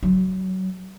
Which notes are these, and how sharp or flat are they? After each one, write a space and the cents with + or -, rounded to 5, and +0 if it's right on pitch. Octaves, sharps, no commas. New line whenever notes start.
F#3 +20